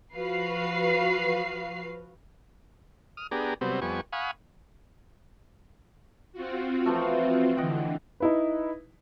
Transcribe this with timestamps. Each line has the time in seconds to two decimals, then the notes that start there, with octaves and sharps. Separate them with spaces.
0.15 F3 F#4 B4 F5 C7
3.17 D#6 F6
3.31 B3 D4 G4 G#4 A#5
3.61 C3 F#3 G3 B3 C4
3.82 F2 G3 B3 G#5 C#6
4.13 F5 F#5 G#5 B5 C#6 D#6
6.33 C4 F4 F#4
6.85 E3 F3 A3
7.57 D3 E3 D#5 F#5 G5
8.20 D#4 E4 B4